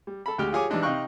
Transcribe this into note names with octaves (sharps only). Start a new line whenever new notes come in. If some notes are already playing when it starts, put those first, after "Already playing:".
G3
A4 B5
D2 G#3 G4 G5 F6
F4 G4 G#4 C#5 G#5 D6
E3 G3 G#3 D4 D#4
C3 D#4 F5 G5 C#6 F#6